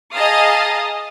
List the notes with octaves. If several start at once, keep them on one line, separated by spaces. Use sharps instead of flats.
G#4 D#5 F5 A5 A#5 D#6